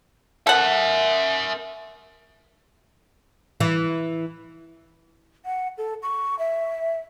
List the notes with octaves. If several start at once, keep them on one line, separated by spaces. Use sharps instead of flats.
A4 A#4 E5 F#5
E3
F#5
A4
C#6
E5